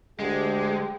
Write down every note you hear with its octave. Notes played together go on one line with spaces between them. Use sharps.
D2 D3 G#3 G4